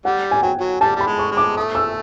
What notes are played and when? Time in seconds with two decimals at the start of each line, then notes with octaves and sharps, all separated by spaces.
0.05 G3 F#5
0.31 G#5
0.43 F#3 G5
0.60 F#3
0.81 G3 A5
0.96 G3 B5
1.07 G#3
1.19 C#6
1.32 G#3
1.37 D6
1.56 A3 D#6
1.75 E6